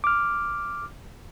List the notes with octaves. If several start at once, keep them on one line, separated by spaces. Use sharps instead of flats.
D6 F6